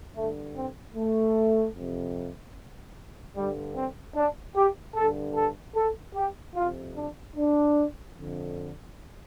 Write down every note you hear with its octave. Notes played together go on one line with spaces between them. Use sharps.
G2 D3 A3
C4
A3
F2 C3
G2 D3 G3
C4
D4
G4
G2 D3 A4
A4
A4
G4
F2 C3 F4
D4
D4
F2 D3